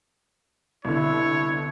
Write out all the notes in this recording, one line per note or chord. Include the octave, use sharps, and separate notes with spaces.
C2 B2 D3 E4 C#5